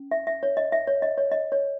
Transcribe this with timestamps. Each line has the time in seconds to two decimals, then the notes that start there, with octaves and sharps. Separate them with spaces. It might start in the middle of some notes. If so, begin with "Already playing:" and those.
Already playing: C#4
0.11 E5
0.27 E5
0.43 C#5
0.57 D#5
0.72 E5
0.87 C#5
1.02 D#5
1.18 C#5
1.32 D#5
1.52 C#5